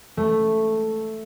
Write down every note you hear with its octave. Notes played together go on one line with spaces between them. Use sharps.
A3